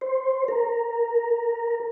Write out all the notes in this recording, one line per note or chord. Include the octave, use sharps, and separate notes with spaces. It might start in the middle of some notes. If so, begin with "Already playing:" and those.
C5
A#4